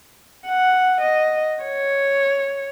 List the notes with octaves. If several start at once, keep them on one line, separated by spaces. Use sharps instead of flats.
F#5
D#5
C#5